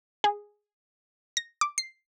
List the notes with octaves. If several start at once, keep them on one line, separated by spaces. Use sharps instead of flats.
G#4
A#6
D6
C7